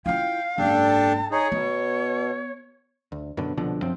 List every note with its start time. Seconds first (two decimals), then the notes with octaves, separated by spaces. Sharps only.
0.06 E4 F4 F5 G5
0.58 F#1 G#2 D4 G4 A4
0.83 A5
1.31 D#4 G#4 C#5
1.52 B2 B3
3.12 D2
3.37 F#2 B2 D3
3.57 C2 B2 D3 F3
3.82 F#2 F3 C4